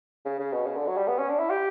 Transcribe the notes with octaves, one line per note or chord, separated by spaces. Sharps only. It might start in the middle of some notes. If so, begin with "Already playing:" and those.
C#3
C#3
B2
C#3
D3
F#3
G3
B3
C#4
D4
E4
G4